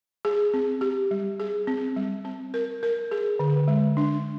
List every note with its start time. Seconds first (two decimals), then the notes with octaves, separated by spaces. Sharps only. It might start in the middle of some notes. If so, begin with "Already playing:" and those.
0.25 G#4
0.54 C4
0.81 G4
1.11 G3
1.40 G#4
1.67 C4
1.96 G3
2.25 C4
2.54 A#4
2.83 A#4
3.11 G#4
3.39 D3
3.68 G#3
3.97 D4